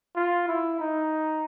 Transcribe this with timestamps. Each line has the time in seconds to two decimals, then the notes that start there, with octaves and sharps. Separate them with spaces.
0.16 F4
0.48 E4
0.80 D#4